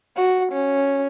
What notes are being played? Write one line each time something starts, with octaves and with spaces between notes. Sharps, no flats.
F#4
C#4